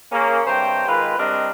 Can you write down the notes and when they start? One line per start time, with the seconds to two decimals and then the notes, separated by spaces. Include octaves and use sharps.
0.12 A#3 C#4 G#4
0.46 G2 C3 C5 C#5 G5 A#5
0.87 D#3 G#3 F4 B4
1.19 G3 C4 D4 A#4 D#5